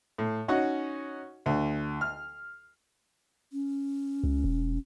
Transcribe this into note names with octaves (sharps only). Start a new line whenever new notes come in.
A2
C#4 D#4 F#4 F#5
D2
F6
C#4
C#2
E1